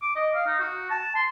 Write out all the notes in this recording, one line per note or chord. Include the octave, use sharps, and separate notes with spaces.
D6
D#5
F5
D#4
F#4
A5
C6